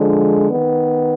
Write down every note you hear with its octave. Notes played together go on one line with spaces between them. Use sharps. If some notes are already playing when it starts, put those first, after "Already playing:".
Already playing: D3 F3 G#3
D#3 B3